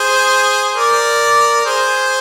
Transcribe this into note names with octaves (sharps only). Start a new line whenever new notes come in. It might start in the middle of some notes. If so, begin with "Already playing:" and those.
Already playing: G#4 C5
A#4 D5
G#4 C5